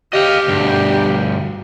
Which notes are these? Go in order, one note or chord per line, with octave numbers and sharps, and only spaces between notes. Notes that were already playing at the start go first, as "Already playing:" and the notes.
G4 D#5 F5
D2 G2